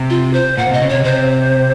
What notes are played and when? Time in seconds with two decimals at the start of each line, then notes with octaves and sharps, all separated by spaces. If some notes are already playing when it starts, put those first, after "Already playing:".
Already playing: C3
0.10 F4
0.33 C5
0.58 A#2 F#5
0.70 C3
0.73 D#5
0.82 C#3
0.89 C3 C#5
1.04 C3 C5